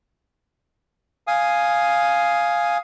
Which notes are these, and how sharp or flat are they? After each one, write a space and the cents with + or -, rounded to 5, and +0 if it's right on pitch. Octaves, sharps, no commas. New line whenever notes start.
F5 +0 G#5 +0 D#6 +5